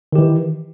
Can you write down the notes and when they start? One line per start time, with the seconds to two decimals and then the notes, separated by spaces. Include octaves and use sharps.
0.12 D#3
0.15 G4
0.18 E3